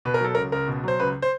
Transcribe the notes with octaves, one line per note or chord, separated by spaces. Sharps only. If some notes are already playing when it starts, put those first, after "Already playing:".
B2 B4
A#4
F#3 A4
C#2 A#4
C#2 A#4
B2
F#3 C5
C#2 B4
C5